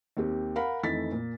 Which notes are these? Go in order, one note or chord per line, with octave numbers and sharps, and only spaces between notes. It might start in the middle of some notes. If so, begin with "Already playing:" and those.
D#2 C4 G4
A#4 F5 F#5 B5
F2 D#3 E3 A3 A6 B6
A#2